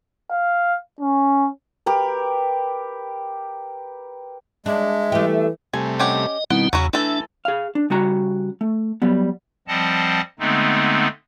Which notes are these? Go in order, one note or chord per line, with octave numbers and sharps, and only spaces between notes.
F5
C#4
G4 A#4 B4
G#3 D4 E5
E3 A3 G4
C3 G3 A3 G#5
C#4 G4 D#5 F#5
B2 D#3 G3 C4 E4 F#5
E2 C#3 F#3 C#4 F#4
E3 A3 D4 A4 E5
G#4 F5
D4
C#3 G3 F#4 A#5
A3
F#3 G3 B3
F3 G3 C4 D#5 F#5 A5
D3 G#3 A3 B3 C4 D#4